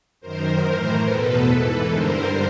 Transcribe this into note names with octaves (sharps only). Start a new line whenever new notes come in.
F#2 D#3 A#4 C5
A2 E3
E2 B2 A4 B4
G#2 E3 A4 B4
G2 D3 A#4 C5